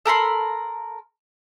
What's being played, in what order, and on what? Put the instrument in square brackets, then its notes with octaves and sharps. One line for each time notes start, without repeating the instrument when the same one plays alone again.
[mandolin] A4 A#4 B5 C6